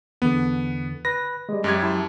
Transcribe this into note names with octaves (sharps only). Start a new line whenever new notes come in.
E2 D3 B3
B4 A#6
G3 G#3
F#2 F#3 G4 G#6
E4 A5 C6